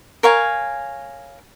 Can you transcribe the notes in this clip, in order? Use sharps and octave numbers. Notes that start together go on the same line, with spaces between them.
A#4 C#5 F5 G#5